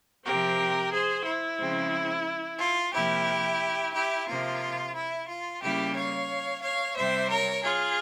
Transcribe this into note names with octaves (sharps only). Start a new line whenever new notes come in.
C3 F3 C4 G4 A#4
G#4 C5
E4
C#3 F3 G#3 C4
F4
C3 F3 A#3 E4 G4
E4 G4
C3 F3 A#3 F4
E4
F4
C#3 G3 A#3 E4 G4
C#5 F5
C#5 F5
C3 G3 C4 C5 E5
A#4 C#5
F4 G#4